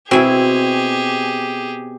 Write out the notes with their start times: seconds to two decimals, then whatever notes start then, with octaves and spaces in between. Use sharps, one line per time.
0.11 B2 C4 E4 G4 G#4 G#5